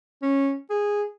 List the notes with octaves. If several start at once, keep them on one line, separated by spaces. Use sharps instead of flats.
C#4
G#4